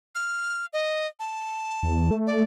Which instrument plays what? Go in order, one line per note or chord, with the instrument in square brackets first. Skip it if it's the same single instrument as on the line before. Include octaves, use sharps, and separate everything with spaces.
[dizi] F6
D#5
A5
[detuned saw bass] E2
A3
[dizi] D5